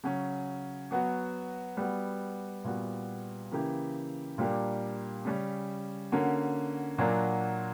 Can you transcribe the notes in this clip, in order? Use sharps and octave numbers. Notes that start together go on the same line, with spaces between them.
C#3 F#3 C#4
F#3 B3 F#4
G3 B3 F#4
A#2 G3 B3 F#4
C#3 E3 A#3 E4 G4
A#2 G3 A#3 D4 G4
C#3 G3 C#4
D3 A#3 C#4 F#4
A#2 F#3 A#3 D4 F#4